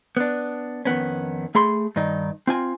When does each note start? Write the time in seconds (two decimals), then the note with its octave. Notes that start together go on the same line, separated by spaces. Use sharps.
0.17 B3 D4
0.85 F2 D#3 B3 C#4
1.55 A3 G#4 B5 C6
1.96 G2 D#3 D#4
2.47 C4 F4 G#5